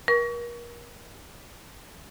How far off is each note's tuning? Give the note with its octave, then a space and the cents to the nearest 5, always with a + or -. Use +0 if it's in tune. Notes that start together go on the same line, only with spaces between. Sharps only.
A#4 +35 C#6 +30